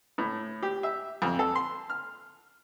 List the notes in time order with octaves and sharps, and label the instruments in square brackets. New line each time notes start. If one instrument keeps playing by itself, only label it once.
[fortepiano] A2
G4
E5
F2
A4
C6
F6